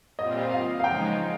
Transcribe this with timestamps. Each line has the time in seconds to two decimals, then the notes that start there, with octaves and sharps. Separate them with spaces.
0.19 A#2 G3 C4 F4 D#5
0.51 F5
0.80 F5
0.84 C#3 F3 G#3 D#4 G5